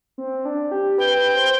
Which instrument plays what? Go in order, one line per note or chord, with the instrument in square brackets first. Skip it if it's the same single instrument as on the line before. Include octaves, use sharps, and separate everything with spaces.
[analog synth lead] C4
D4
G4
[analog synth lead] B4 [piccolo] G5
[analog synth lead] B4
C5